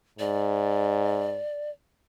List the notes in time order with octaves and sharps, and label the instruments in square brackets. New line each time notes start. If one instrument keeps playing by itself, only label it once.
[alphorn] G#2 [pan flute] D5